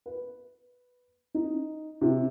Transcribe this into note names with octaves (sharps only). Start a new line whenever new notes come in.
B4
D#4
C3